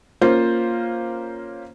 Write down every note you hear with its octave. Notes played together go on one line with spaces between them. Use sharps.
A#3 C#4 F4 C5